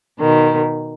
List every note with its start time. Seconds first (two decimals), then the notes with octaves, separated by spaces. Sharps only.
0.19 B2 D#3